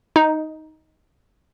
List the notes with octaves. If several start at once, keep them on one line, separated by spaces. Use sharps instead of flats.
D#4